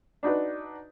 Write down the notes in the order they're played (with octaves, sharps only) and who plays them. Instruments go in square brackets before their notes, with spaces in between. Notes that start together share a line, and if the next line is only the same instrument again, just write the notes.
[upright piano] D4 D#4 F#4 B4